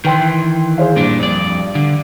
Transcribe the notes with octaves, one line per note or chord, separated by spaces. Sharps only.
D#3 E3 B4 G5 C6
G#4 C5 F5
G2 A#2 D4
F2 D5
D3